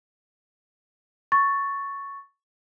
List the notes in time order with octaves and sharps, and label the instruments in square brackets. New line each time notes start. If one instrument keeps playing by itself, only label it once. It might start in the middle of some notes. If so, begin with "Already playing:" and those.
[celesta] C#6 A6